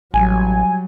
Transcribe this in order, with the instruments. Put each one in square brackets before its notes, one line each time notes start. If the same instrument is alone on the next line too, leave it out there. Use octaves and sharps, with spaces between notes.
[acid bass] A1 [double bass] F#3 G3 [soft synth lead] G#5